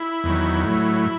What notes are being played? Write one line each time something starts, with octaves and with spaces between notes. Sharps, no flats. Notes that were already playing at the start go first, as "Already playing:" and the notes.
Already playing: E4
E2 D#3 F#3
A2 F#3 E4